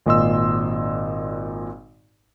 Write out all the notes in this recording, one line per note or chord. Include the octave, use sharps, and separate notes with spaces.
G#1 A#2 D#5 C6 E6